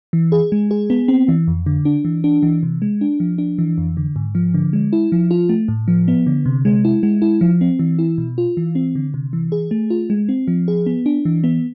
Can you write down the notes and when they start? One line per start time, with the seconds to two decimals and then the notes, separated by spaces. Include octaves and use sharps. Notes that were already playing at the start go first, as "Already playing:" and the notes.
0.13 E3
0.32 G#4
0.52 G#3
0.71 G#4
0.90 B3
1.08 C4
1.28 E3
1.47 F2
1.66 D3
1.85 D4
2.05 E3
2.24 D4
2.42 E3
2.63 C3
2.82 G#3
3.01 D4
3.20 F3
3.38 D4
3.58 E3
3.78 F2
3.97 D3
4.16 G#2
4.35 F3
4.54 D3
4.73 G#3
4.93 E4
5.12 F3
5.31 F4
5.49 A3
5.68 A2
5.88 F3
6.08 B3
6.27 D3
6.46 C3
6.65 G#3
6.85 E4
7.03 G#3
7.22 E4
7.41 F3
7.61 C4
7.79 E3
7.99 E4
8.18 B2
8.38 F4
8.57 E3
8.75 C4
8.95 D3
9.14 C3
9.33 E3
9.52 G#4
9.71 A3
9.90 F4
10.10 G#3
10.29 C4
10.48 F3
10.68 G#4
10.86 B3
11.06 D4
11.25 E3
11.44 B3